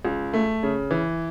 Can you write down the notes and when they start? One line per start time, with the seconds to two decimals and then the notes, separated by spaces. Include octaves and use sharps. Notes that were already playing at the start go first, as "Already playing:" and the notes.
0.05 C#2
0.33 A3
0.63 C#3
0.91 E3